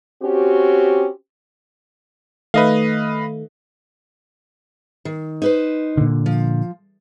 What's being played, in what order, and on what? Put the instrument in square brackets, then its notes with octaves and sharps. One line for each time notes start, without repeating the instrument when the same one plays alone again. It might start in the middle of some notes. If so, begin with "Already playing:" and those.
[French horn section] C4 C#4 F#4 G4
[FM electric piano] D#3 A3 [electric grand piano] B4 D#5 F5
[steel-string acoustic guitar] D#3
D#4 B4 C5
[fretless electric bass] A#2 D3
[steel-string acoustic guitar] F3